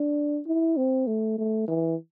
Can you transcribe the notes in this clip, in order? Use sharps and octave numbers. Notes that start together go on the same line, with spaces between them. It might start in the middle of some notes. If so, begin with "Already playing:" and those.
Already playing: D4
E4
C4
A3
A3
E3